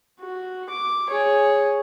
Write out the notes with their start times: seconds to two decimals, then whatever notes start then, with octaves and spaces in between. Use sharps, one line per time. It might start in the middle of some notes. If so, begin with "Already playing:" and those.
0.20 F#4
0.70 D6
1.10 G#4 C#5